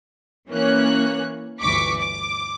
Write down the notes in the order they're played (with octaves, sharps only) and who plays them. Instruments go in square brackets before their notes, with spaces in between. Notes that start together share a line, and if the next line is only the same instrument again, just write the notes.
[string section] E3 A#3 C#4 C#5 F#6
G1 D2 E3 C#6 D6 B6
D6